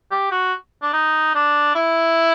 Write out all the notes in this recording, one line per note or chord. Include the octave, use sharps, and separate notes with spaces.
G4
F#4
D4
D#4
D4
E4